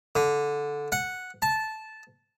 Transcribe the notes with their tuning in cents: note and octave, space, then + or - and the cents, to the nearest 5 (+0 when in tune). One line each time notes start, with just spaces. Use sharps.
D3 -10
F#5 -5
A5 -10